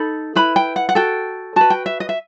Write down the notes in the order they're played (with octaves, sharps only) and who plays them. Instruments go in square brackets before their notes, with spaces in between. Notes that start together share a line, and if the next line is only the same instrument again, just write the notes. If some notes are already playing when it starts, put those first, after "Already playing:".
Already playing: [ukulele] D#4 A4 B5
E4 B4 B5
G5
F#5
F#5
F#4 A4 G5
F#4 B4 A5
G5
E5
D#5
E5